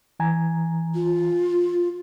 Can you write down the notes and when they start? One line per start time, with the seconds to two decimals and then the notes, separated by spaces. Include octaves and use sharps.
0.20 E3 G#5 A#5
0.94 F4